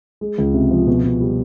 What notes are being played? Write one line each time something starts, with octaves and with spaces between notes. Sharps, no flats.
G#3
C#2
C3
F3
B2
B2
G3